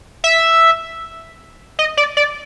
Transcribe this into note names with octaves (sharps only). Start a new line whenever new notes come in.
E5
D#5
D5
D5